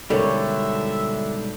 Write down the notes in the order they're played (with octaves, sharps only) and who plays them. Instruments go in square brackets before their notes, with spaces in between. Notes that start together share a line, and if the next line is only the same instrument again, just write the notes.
[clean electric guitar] G#2 B2 G3 [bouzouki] D3 [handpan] A4 A#4 C#5 [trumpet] E5